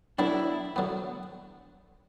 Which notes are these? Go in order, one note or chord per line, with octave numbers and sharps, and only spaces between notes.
D3 F#3 B3 D4 E4
D3 F#3 B3